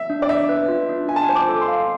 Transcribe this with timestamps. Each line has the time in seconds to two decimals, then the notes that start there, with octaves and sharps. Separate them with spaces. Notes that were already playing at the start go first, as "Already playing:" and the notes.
Already playing: E5
0.10 D4
0.22 D5
0.29 D4 E5
0.49 B4
0.68 F4
0.89 D4
1.08 F4 G#5
1.16 A5
1.23 G#5
1.29 C5
1.35 D6
1.49 A4
1.62 C6
1.68 F5